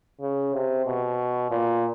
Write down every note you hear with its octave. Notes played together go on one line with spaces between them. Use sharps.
C#3
C3
B2
A#2